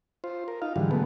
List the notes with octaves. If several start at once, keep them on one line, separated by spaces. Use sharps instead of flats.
F4 C5
A#4
D#4 F4 F5
G#2 D3 E3 F#3 G3
B2 D3 F#3 G#3 A3 B3